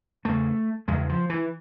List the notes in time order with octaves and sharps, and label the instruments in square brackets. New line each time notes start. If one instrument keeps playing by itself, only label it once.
[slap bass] E2 C#3 A3
E2 C#3 G#3
F3
E3